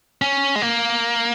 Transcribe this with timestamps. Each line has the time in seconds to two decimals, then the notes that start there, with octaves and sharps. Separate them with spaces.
0.22 C#4
0.56 G#3
0.62 A#3